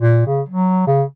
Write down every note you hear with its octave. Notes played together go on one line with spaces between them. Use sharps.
A#2
C#3
F#3
C#3